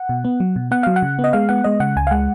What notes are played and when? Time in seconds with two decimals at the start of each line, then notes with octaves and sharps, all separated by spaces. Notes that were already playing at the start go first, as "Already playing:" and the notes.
Already playing: F#5
0.09 B2
0.25 B3
0.40 F#3
0.56 B2
0.71 B3 F#5
0.83 F#3 F5
0.96 F#5
1.02 C#3
1.19 B3
1.24 D#5
1.33 G#3 F5
1.49 B3 F#5
1.64 G#3 D#5
1.80 C#3 F#5
1.96 C#2 G#5
2.07 F5
2.11 G#3 F#5